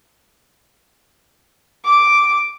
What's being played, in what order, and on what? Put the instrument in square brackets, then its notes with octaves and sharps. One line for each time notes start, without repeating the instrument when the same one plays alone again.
[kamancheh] D6